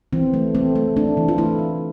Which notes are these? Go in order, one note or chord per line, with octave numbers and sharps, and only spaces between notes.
E3 C4
A3
A3 C4
A3
A3 D4
E3
F4
A3 E4
A3